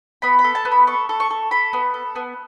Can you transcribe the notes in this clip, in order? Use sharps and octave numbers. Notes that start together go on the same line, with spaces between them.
B3 B5
B5
A4
A5
B3
B5
A4 C#6
A4
C#6
A4
A4 B5
B3
A4
B3